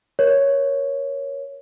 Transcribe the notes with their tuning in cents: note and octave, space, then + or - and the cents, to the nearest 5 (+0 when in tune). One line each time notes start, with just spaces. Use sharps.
A#4 +25 C#5 +0